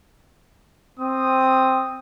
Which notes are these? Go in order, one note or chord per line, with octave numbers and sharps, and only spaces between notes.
C4 D#6